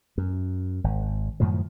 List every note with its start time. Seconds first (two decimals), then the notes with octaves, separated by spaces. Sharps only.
0.18 F#2
0.84 G#1
1.40 F#2 A2 D#3 F3